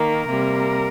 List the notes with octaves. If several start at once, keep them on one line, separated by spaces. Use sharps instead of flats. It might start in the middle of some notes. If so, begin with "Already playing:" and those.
Already playing: D#3 A#3 A#4
C3 G3 A#3